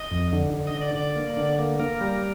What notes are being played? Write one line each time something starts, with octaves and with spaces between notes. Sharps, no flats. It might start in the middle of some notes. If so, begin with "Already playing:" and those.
Already playing: D#5
F2
D3
D3
D#5
D3
D5
D3 D5
A#3
D3
A#3
A#3 A#4
G3